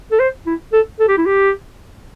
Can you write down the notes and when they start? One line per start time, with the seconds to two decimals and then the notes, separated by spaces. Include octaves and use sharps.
0.11 A4
0.20 C5
0.46 E4
0.72 A4
0.99 A4
1.08 G4
1.17 E4
1.26 G4